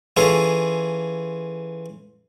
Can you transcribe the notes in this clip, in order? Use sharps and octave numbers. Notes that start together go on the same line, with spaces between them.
E3 C#4 F4 G#4 A4